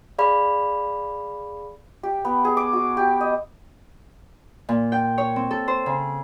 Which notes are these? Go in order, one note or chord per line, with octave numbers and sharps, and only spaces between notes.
G#4 D5 F5 B5
G4
B3
G#4
D6
F#4
G4
D#5
A#2
G5
C#5
C4
A4
C5
C#3